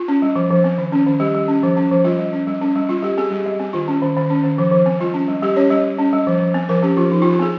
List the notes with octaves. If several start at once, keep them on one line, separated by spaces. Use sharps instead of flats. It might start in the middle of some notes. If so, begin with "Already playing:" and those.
Already playing: F4
C#4
G3
F3
F3
C4
D#3
C#4
D#3
G3 G4
G3
C#4
F3
C#4
F3
G3 F4
G3
C#4
G3
C#4
G3
G3 F4
G3 G4
C4 G#4
G3 G4
G3
C4
D#3 F4
C#4
D#3
D#3
C#4
D#3
F3
F3
C4
G3 F4
C#4
G3
G3 G4
C#4 C#5
G3 D#5
G3
C#4
G3
F3
F3
C4
F3 A#4
C#4 G4
F3 F4
F3 D#4
F4
F3
F4
C4 G#4